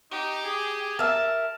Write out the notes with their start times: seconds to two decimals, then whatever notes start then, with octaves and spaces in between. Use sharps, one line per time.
0.11 D#4 G4
0.44 G#4
0.99 A#4 E5 A5